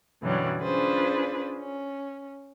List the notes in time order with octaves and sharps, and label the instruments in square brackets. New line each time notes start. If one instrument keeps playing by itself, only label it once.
[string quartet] F#2 B2 D3 E3 F#3 G3
C#4 D4 F4 G#4 B4 C5
C#4